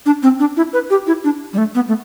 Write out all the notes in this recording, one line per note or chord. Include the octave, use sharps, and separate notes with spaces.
D4
C4
D4
E4
B4
G4
E4
D4
G3
A3
B3
A3